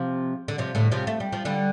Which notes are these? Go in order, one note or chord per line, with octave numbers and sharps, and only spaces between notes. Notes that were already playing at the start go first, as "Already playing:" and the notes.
Already playing: C3 F3
D3
C3 F3
A2 D3
C3 F3
A3
G3
F3
D3 G3